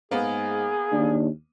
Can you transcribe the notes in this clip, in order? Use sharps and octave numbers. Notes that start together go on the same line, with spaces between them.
G#2 A#3 B3 G#4
D#2 D4